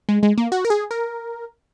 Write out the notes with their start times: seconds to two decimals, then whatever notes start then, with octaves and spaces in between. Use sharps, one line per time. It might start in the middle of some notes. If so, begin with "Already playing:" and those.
0.09 G#3
0.23 G#3
0.38 A#3
0.52 F#4
0.65 A#4
0.70 G#4
0.91 A#4